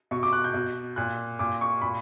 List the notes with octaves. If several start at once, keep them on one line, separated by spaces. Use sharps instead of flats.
B2 C#6
D6
F#6
G6
B2
A#2 F#6
A#2 D6
C#6
A#2 B5